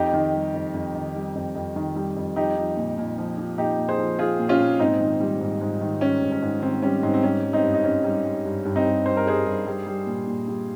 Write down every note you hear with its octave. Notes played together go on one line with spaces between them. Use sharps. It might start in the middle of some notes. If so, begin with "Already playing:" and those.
Already playing: F2 D#4 G4
D#3
G3
F2
F2
D#3
G3
F2
F2
D#3
G3
F2
F3 D#4 G4
F3
A#2
A#2
F3
F3
A#2 D#4 G4
A#2
G#4 C5
F3
F3 F4 G#4
A#2
C#4 F4
A#2
G#2 C4 D#4
D#3
G3
G#2
G#2
D#3
G3 C#4
G#2
C#4
G#2
D#3 C4
G3 C#4
G#2 C4
C4
G3 C#4
G3
C4 D#4
G2
D#4
G2 C#4
G3
G3
G2
G2
C4 D#4
G3
G3 C5
A#4
G2 G#4 C5
G2
G3
G3
A#2
A#2
G3